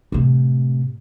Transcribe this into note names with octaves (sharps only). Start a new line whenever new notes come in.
A2 C3